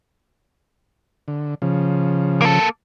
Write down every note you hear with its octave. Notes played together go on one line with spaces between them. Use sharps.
D3
C#3 F3
A#3 A4